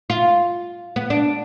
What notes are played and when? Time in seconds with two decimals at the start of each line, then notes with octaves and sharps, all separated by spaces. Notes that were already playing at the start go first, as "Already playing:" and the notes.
0.10 F4
0.96 B3
1.10 D4